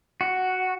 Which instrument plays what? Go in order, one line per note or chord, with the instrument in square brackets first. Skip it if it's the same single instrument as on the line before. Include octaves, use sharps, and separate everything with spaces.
[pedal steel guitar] F#4